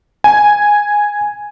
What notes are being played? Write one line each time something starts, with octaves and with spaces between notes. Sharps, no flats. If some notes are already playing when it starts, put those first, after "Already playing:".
G#5